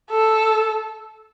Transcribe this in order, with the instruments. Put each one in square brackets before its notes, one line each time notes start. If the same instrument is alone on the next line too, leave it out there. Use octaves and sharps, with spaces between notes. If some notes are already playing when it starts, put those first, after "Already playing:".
[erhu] A4